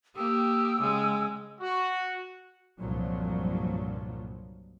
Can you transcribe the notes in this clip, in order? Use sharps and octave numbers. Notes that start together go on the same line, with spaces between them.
A#3 G4 G5 D#6 E6
C#3 G#3
F#4
C2 G2 A#2 F3 F#3